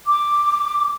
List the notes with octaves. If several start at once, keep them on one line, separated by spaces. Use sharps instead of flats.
D6